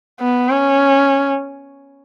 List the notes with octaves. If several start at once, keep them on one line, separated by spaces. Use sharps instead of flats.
B3
C#4